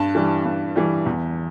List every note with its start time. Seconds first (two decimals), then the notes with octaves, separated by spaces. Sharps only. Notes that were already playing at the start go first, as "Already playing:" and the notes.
Already playing: G2 A5
0.15 E3 G3
0.45 G2
0.76 E3 G3
1.06 E2